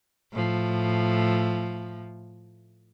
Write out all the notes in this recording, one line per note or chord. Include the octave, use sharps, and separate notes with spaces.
A2 F3